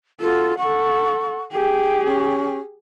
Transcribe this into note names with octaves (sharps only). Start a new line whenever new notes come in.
F4 F#4 A4
A4 F#5 C#6
G4 G#4 G5
C#4